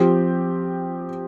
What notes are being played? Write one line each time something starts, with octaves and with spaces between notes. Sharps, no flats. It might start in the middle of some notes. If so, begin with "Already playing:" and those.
Already playing: F3 C4 G4